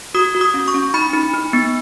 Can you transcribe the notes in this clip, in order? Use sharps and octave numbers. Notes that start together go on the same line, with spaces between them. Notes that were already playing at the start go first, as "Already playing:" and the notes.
F#4 D#6
F#4
D#6
C#4
C#6
C#4
D#4 B5
D#4
D#4
B3